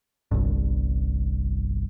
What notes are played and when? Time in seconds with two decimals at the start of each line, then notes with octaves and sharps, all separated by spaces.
0.31 G1 C2 G2